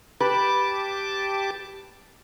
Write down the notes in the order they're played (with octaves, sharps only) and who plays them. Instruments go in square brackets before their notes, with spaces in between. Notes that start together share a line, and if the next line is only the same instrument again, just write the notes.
[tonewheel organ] G4 A5 D6 [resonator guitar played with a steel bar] B4